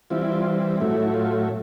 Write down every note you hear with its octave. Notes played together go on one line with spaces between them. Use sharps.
E3 G3 C4 E4 F4
E4
F4
A2 F#3 A3 E4
E4
E4
F4